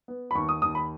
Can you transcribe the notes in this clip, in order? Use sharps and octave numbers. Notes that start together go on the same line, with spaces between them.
B3
B5
D#2 C#6
D#6
D#2 D#6
B5